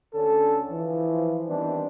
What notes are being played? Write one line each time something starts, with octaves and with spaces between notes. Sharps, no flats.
D2 D3 C#4 A4
E3 F3
D#3 E3 G3 B3 C4 D4